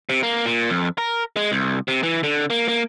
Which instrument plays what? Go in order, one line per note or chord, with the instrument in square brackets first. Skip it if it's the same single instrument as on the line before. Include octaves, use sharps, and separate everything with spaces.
[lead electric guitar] C3
A#3
A#2
F2
A#4
G#3
C2
C3
E3
D3
A#3
A#3